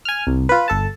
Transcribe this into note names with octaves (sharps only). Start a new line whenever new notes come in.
G#5 F6
C2
F4 B4
G1 A4 A5